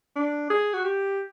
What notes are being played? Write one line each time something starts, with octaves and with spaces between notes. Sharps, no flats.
D4
G#4
F#4
G4